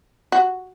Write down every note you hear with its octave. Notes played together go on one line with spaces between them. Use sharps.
F#4